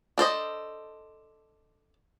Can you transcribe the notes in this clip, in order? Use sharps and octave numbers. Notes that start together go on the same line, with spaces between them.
D4 A4 C5 D#5